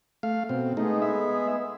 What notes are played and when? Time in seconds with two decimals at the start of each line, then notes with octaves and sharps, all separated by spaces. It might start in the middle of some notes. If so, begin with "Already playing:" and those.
0.23 A3 F5
0.49 B2 C4
0.77 G#3 A3 B3 D#4 G#4
1.02 E5